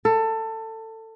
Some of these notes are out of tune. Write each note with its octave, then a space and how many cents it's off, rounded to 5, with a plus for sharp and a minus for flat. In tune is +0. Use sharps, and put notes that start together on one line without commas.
A4 +20